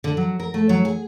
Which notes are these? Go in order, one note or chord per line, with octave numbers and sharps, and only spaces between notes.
D3
F#3
A#4
A3
F#3
G#4